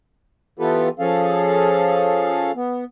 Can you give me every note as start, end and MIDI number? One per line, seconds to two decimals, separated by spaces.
0.59 0.89 52
0.59 0.89 59
0.59 0.89 65
0.59 0.89 67
0.59 0.89 69
0.59 0.89 71
0.99 2.51 53
0.99 2.51 61
0.99 2.51 68
0.99 2.51 69
0.99 2.51 77
2.55 2.84 59